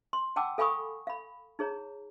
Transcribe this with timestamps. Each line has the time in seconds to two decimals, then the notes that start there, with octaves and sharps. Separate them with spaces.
0.13 C6
0.36 F#5 G5 A5 D6 E6
0.58 A4 F5 G#5 B5 C#6 D#6
1.07 F5 B5
1.59 D#4 G#4 C#5 A#5